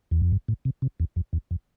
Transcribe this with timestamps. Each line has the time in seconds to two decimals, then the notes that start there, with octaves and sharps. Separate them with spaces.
0.11 E2
0.22 F2
0.32 G2
0.48 A2
0.65 C3
0.82 C3
1.00 E2
1.16 F2
1.33 E2
1.51 F2